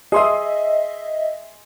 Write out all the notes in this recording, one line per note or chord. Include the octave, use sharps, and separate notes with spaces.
G#4 D#5 E5 C6 D#6